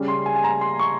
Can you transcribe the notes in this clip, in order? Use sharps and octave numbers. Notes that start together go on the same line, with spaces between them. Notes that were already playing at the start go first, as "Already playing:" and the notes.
Already playing: C#3 G3 C#4
C6
G#5
G#5
A#5
C6
C#6